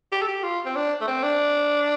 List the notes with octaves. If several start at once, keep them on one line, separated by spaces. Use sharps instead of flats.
G4
A4
G4
F4
C4
D4
A3
C4
D4